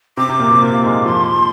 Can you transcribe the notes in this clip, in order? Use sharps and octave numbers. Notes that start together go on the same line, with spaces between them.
C3 C4 D6
C3 C4
A#2 A#3
C3 C4
A#2 A#3
A#3
G#2 G#3
F2 F3 C6